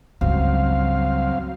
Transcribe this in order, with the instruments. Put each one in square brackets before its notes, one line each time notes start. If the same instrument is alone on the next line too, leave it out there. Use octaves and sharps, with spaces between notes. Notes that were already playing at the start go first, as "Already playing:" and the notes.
[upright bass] C#2 G2 [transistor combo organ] F#3 C4 F5